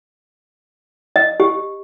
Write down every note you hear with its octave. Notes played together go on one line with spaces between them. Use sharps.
D#5
G4